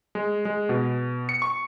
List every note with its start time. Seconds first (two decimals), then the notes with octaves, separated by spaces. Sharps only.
0.15 G#3
0.45 G#3
0.69 B2
1.29 C#7
1.42 C#6